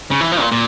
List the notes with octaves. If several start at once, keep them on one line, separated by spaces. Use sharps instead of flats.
C#3
E3
F3
A#2
A#2